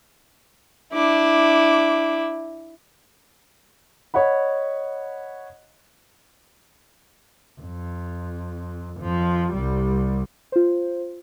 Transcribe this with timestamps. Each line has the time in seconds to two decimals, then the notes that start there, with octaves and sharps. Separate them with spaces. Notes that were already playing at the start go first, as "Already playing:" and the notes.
0.94 D4 E4 D6
4.14 C#5 D#5 F#5 B5
7.60 F2
9.00 F2 F3
9.52 C2 G3
10.52 F4 C5